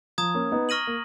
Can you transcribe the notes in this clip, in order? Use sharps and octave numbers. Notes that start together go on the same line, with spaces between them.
F3 A#5 D#6 G#6
A#3 C#4
B3 D#4
C#6 F6 A#6 D#7 F#7
A#3